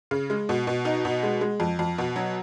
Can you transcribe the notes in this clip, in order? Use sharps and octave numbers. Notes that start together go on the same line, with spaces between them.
C#3
G#3
B2
B2
D#4
B2
G#3
G#3
F2
F2
B2
F#3